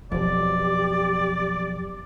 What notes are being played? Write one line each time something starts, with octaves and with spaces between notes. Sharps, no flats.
B1 F2 F#3 B3 G4 D5